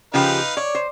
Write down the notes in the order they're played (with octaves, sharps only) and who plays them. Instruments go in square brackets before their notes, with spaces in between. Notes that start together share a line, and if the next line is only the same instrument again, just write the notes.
[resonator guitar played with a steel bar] C#3 F3 G4 [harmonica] D#4 B4 F5
[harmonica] C#5 [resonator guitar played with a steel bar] D5
[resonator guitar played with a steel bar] C5